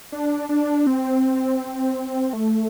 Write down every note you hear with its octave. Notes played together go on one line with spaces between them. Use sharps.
D4
D4
C4
A3